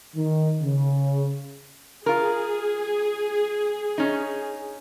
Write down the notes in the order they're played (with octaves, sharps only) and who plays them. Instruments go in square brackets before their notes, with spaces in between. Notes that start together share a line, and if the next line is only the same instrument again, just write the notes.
[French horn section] D#3
C#3
[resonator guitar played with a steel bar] F4 A#4 [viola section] G#4
[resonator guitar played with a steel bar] C#4 D#4